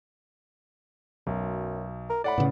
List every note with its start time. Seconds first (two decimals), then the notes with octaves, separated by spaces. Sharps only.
1.27 B1 F#2
2.10 A#4
2.24 A2 D5 F#5 B5
2.38 A2 C#3 B3